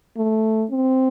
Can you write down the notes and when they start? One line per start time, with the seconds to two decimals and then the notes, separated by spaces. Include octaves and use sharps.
0.17 A3
0.71 C4